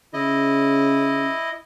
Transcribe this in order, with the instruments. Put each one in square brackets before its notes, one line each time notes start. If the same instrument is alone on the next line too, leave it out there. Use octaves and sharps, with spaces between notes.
[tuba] C#3 [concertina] E4 D#5